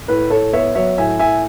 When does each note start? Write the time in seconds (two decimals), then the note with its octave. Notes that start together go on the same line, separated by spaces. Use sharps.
0.08 A2 B4
0.30 A2 A4 C#5
0.53 B3 C#5 E5
0.75 F#3 C#5 E5
0.98 A2 E5 G#5
1.19 A2 E5 G#5